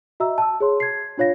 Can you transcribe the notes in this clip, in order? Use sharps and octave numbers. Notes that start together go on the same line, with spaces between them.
F#4 D#5 E5 A#5 E6
A5 E6
G#4 C#5 C6
G#6 C7
D4 F4 C#5 F5 A#6